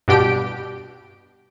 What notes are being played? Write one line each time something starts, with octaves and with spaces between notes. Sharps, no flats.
G2 B2 D4 G4 D7